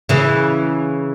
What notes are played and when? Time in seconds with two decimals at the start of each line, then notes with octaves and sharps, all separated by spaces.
0.09 C#3 E3